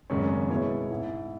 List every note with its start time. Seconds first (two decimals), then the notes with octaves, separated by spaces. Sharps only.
0.10 G#1 F#2 C#3 G#3 C#4
0.50 B2 G#3 B3 E4 C#5
0.91 G#2 G#3 E4